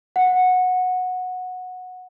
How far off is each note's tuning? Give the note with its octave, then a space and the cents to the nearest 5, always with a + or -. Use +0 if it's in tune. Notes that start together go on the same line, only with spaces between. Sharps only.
F#5 -15